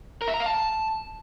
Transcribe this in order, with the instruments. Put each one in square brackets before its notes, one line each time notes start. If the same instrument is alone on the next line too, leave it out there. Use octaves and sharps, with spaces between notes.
[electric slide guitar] A#4
E5
A#5
F5
A5